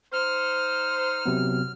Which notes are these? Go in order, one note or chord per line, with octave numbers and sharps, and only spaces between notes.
D#4 C5 F6
C3 F#3 B3